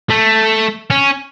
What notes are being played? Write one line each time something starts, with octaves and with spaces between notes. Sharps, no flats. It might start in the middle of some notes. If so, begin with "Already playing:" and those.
A3
C#4